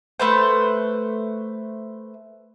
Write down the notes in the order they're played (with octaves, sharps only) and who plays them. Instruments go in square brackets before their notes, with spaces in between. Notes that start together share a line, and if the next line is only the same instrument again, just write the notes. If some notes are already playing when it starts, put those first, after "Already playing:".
[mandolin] A3 B4 C5